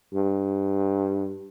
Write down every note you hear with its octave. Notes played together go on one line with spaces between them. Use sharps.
G2